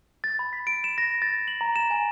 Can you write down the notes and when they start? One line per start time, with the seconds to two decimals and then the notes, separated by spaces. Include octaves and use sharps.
0.24 A6
0.39 B5
0.53 B6
0.67 D7
0.84 E7
0.98 A#6
1.22 A6
1.48 F#7
1.61 A#5
1.76 E7
1.90 G#5